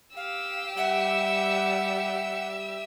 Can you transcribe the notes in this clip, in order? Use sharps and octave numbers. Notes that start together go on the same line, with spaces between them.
G4 F5 E6
G3 E5 F#5